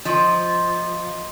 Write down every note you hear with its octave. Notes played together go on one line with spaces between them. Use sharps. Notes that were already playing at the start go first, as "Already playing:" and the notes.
F3 D#5 C6